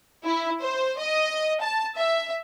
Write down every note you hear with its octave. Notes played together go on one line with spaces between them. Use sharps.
E4
C5
D#5
A5
E5